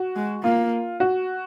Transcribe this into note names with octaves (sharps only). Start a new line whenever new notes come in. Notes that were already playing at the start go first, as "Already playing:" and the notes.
Already playing: F#4
G#3
A#3 F4
F#4